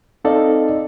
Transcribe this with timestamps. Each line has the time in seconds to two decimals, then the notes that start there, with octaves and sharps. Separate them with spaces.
0.25 C4 D#4 A4 D5 D#5 F5